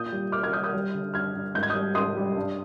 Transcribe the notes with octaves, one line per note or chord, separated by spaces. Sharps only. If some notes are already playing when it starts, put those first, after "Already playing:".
Already playing: A#2 D#6 G6
G3
A#2 D6 F6
F6 G#6
G3 D#6 G6
D#6 G6
G3
D3
G2 F6 G#6
G2
G#2 G6
G#6
G3 D#6 G6
G#2 C6 D#6
G3
G2